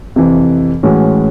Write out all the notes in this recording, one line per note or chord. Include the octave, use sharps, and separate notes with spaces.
F2 C3 E3
A2 E3 G#3 C#4 F#4